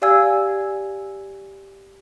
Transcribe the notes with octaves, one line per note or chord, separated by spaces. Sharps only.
G4 D5 F5 G#5 E6 G#6